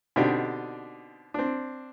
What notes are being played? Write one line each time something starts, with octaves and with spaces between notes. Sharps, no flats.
B2 D3 C4 D4 D#4 G4
C4 D4